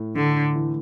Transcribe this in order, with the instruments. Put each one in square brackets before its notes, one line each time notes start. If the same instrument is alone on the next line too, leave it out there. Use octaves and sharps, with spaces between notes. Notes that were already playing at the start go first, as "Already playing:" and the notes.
Already playing: [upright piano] A2
[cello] D3 [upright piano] A3
[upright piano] E3